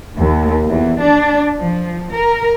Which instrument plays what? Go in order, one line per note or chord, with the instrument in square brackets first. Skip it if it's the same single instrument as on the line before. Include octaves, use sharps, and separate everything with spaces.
[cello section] D#2
E2
D4
F3
A#4